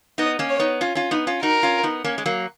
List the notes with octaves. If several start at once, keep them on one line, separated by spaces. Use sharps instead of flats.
B3 D#4 D#5
A#3 C#4
C#5
B3 D#4
C#4 F4
C#4 F4
B3 D#4
C#4 F4
D#4 F#4 A#4
C#4 F4
B3 D#4
A#3 C#4
G#3
F#3 A#3